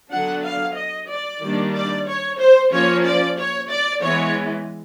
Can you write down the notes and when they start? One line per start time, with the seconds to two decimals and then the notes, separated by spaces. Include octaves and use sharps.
0.11 D3 F#3 B3 D4 F#5
0.44 F5
0.76 D#5
1.09 D5
1.41 D#3 G3 A#3 D4
1.74 D5
2.07 C#5
2.39 C5
2.71 F3 A#3 C#4 C#5
3.05 D5
3.37 C#5
3.70 D5
4.02 E3 G#3 B3 C#5